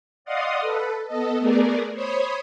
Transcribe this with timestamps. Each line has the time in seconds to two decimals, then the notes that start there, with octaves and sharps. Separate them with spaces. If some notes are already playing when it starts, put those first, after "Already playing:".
0.25 D5 D#5 F5 F#5 C6 D#6
0.61 A4 B4
1.06 B3 A4 D#5
1.38 A3 B3 G#4 A#4 D5
1.94 C5 C#5 B5 D#6 G#6